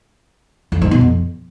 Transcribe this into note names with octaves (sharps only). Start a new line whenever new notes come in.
F2
G#2
B2
F2